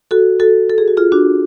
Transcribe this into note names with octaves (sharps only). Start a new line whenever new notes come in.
F#4 A4
F#4 A4
A4
G#4
F#4
F4 G#4
D4 F#4